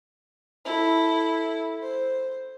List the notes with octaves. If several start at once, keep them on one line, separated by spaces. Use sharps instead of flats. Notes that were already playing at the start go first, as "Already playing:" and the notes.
E4 A4
C5